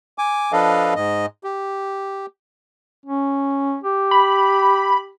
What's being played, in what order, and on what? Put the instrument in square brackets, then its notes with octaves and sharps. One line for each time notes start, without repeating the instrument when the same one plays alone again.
[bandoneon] G#5 D6
F3 D4 A4 B4 D#5 F5
G#2 D#5
G4
[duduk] C#4
G4
[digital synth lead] B5